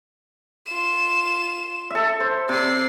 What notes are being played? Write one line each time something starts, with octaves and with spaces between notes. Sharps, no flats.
F4 E7
A4 E5
C5
C3 D5 C7